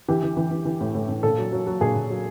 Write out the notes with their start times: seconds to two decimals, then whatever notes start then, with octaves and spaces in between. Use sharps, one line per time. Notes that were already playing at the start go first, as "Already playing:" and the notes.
0.08 E3 G4
0.23 E3
0.37 E3
0.51 E3
0.65 E3
0.80 A2
0.95 A2
1.09 A2
1.23 A#2 A4
1.39 F#3
1.52 F#3
1.67 F#3
1.81 A#2 G#4
1.96 A#2
2.10 F#3